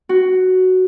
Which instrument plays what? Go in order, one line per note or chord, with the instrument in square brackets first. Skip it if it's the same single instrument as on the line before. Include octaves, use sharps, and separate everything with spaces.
[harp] F#4